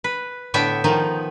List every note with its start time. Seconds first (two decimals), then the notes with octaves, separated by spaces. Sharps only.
0.04 B4
0.54 A2 D3 B3 E5 G5
0.84 D#3 F3 D#4